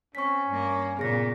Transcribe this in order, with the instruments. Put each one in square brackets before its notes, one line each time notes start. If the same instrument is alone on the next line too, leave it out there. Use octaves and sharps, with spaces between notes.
[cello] C4 [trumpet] C#4 [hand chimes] C#6 B6
[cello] G2 A#3
[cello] A#2 C#3 [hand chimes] B3 G#4 A#6